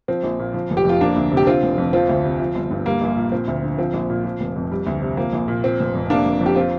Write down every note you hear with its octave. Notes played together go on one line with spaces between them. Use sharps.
F3 C4
A#1
A#2
F3
F1
G4
F2 F4
F3 A#3 D4
D2
C3
G4
D3 C4 F4
F1
F2
F3 C4 F4
D2
C3
F3
G1
G2
G3 A#3
A#1 A#3
A#2
F3 C4
D2
D3
F3 C4
A#1
A#2
F3
F1
F2
G3
D2
C3
F3 A#3
A#1
A#2
F3 C4
F1
F2
C3 A#3 D4
F1
F2
G4
F3 C4 F4